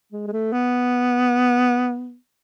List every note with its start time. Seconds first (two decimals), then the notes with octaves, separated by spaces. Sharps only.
0.13 G#3
0.27 G#3
0.33 A3
0.53 B3